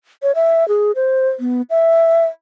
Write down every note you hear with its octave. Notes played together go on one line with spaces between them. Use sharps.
C#5
E5
G#4
C5
B3
E5